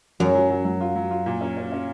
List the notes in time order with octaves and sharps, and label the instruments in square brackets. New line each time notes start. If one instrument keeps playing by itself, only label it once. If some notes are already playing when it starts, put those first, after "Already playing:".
[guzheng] F#2 [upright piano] F#3
[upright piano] F#3
F#3
F#3
F4
F#3
F4
A#2
C#4
C#4
C#4